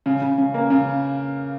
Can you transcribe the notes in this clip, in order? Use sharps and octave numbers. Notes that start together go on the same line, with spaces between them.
C#3
C#3
C#3
A#3
C#3